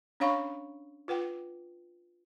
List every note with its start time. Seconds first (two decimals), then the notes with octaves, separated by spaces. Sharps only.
0.20 C#4 D4 C#5 F5 B5 C#6
1.08 F4 B4 F#5 G5